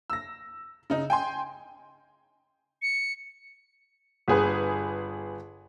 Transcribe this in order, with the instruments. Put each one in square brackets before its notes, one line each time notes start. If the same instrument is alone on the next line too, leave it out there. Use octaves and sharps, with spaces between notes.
[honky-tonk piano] E6 A#6
C#3 D#4
G5 G#5 C6
[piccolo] C#7
[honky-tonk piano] G1 G#4 B4